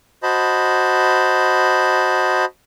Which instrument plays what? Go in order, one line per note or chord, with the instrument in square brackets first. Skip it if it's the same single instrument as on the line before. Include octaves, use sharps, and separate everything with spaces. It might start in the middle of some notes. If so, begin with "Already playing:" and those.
[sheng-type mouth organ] F#4 C5 D#5 A5 B5